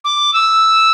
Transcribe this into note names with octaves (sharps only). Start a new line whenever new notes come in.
D6
E6